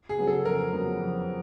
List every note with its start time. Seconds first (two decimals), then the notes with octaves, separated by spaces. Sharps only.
0.09 G#4
0.18 C#3 F#3 B3
0.27 A4
0.45 F2 A#4
0.73 C#3 F#3 B3
1.00 F2